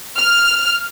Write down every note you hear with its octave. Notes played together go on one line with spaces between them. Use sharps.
F6